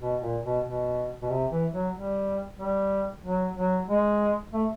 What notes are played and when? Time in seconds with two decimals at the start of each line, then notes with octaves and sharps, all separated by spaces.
0.01 B2
0.21 A#2
0.44 B2
0.65 B2
1.22 B2
1.30 C3
1.51 E3
1.73 F#3
1.94 G3
2.59 G3
3.24 F#3
3.56 F#3
3.88 G#3
4.53 A3